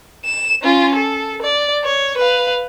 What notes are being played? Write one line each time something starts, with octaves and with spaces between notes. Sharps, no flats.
E7
C#4 F4
A4
D5
C#5
B4 F5